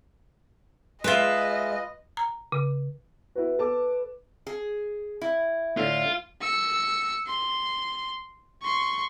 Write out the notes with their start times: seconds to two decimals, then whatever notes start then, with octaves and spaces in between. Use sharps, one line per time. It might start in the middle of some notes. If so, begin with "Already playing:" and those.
1.04 G#3 F4 B4 D#5 E5
2.17 A#5
2.52 C#3
3.35 E4 F#4 B4
3.58 A4 A5 D6
4.47 G#4
5.21 E4
5.77 A2 D3 F4
6.41 E6 C#7
7.27 C6
8.63 C6 C#6